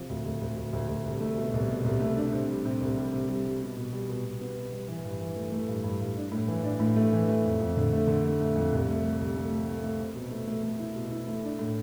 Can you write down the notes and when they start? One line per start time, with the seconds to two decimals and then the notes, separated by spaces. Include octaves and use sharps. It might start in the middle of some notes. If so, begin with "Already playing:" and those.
Already playing: C3 F3
0.10 D2
0.25 D2
0.41 D2
0.57 D2
0.73 D2
0.88 D2
1.06 C2
1.21 A3
1.37 B2
1.54 C2
1.68 B2
1.84 C2
2.00 A3
2.16 D4
2.33 C3
2.49 G3
2.65 C3
2.81 C2
2.97 G3
3.13 C3
3.28 G3
3.45 G3
3.61 B2
3.77 B2
3.92 G3
4.09 B2
4.24 B2
4.41 B3
4.56 B2
4.72 G3
4.88 E3
5.04 G2
5.21 E3
5.36 A3
5.52 A3
5.68 G2
5.84 G2
6.01 G2
6.16 D4
6.32 A2
6.48 E3
6.64 D4
6.80 A2
6.96 A3
7.13 E3
7.28 A3
7.44 F2
7.60 F2
7.77 D3
7.92 A3
8.07 D3
8.24 A3
8.40 A3
8.56 F2
8.72 C2
8.87 A3
9.04 A3
9.20 C2
9.36 A3
9.52 A3
9.68 A3
9.84 A3
10.00 C4
10.15 B2
10.31 A3
10.47 A3
10.63 A3
10.79 E4
10.95 B2
11.11 E4
11.28 A3
11.44 D4
11.59 A2